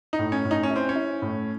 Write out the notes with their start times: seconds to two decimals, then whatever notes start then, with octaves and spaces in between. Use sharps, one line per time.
0.13 D#4
0.19 A2
0.32 C#4
0.45 A2
0.51 D#4
0.63 C#4
0.70 E4
0.76 C4
0.89 C#4
0.95 E4
1.22 A2